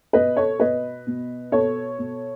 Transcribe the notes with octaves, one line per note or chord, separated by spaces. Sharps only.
B2 B4 D#5
A4 C#5
B2 B4 D#5
B2
B2 A4 C#5
B2